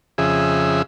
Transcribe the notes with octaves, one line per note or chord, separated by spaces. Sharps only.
F2 C#3 G#4 E5